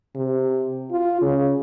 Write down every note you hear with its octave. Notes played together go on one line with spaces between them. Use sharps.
C3
F4
C#3